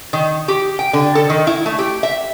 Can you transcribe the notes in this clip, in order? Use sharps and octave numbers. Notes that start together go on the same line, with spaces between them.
D#3
G4
G5
D3
A4
D#3
E4
A3
G4
E5